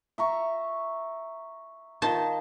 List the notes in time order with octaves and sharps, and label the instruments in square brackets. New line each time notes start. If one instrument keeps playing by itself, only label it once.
[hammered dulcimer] E5 A#5 C#6
[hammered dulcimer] D#3 F4 [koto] C5 A5